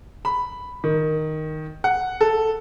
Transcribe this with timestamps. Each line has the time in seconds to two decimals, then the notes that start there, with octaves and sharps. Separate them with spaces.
0.25 B5
0.84 D#3
1.84 F#5
2.21 A4